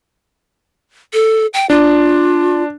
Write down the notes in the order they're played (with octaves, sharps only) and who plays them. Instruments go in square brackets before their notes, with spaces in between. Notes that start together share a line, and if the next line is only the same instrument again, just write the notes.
[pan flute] A4
G5
[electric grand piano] D4 [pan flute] F4